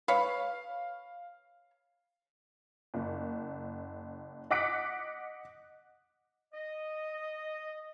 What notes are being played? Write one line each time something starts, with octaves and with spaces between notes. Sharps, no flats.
B4 C#5 F5
F#1
D#5 F#5 D6 F#6 B6 D7
D#5